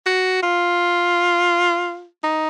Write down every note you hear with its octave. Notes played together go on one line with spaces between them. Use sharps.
F#4
F4
D#4